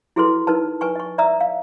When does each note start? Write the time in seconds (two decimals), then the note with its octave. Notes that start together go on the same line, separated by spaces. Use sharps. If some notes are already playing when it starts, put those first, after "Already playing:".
0.16 E4 F#4 G#4 A4 B4 C6
0.47 D#4 A#4 B4 A5
0.81 B4 G#5 C#6
0.95 D#5 C#6
1.18 D5 E5 A#5 D#6 E6
1.40 F5